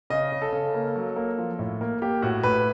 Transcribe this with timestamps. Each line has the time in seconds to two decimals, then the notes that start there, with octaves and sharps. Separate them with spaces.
0.10 C#3 D#5
0.32 C#3
0.42 A4
0.53 C#3
0.74 A#3
0.95 F#3
1.16 A#3
1.38 F3
1.59 A2
1.81 A#3
2.02 A#3 G4
2.22 A2 F#4
2.43 A2 B4